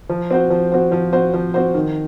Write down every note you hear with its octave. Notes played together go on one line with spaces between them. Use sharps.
F3
C4 F#4 C5
F3
C4 F#4 C5
F3
C4 F#4 C5
F3
C4 F#4 C5
D#3